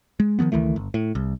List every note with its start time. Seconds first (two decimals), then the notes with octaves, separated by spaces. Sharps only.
0.20 G#3
0.39 D#3 F3 A3 B3
0.52 C#2 D#3 E3 A3
0.76 G1
0.94 A2
1.15 C2